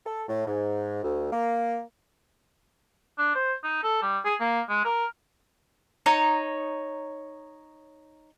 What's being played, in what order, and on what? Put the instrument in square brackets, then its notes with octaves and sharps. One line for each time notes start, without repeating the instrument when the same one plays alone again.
[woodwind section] A4
A2
G#2
D2
A#3
[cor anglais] D4
C5
D#4
A4
G3
G#4
A#3
G#3
A#4
[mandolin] D#4 C#5 A#5